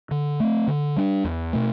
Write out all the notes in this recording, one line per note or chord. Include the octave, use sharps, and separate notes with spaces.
D3
A3 C4
D3
G3 D4
E2
B2 A3